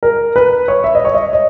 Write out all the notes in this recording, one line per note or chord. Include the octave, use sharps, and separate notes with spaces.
A#4
B4
C#5
E5
D#5
C#5
D#5
D#5